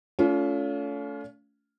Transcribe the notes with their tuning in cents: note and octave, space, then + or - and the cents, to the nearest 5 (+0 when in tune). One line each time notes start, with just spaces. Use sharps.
A3 -5 C#4 +40 F4 +0